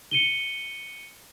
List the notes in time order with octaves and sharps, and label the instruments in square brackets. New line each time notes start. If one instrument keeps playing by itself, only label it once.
[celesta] C#7 D#7 G7